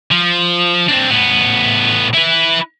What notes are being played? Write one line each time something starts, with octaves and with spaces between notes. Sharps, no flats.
F3
C4 D4
A2 B3
E4 B4